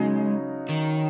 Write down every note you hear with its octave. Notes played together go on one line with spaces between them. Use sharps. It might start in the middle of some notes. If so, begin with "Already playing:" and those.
Already playing: C#3 F#3 G#3 D#4
D#3